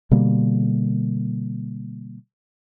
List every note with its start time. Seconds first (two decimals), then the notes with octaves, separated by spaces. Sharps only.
0.11 B2 D3 G3 A#3